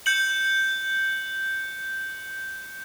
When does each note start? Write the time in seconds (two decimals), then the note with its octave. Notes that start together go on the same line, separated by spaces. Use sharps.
0.06 G6 C#7 F#7